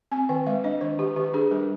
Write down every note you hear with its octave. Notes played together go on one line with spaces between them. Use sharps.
C4 G#5
D#3 G5
G#3 F5
D4 D#5
D#3 C5
D#3 G4
D#3 G4
D4 G#4
G3 A#4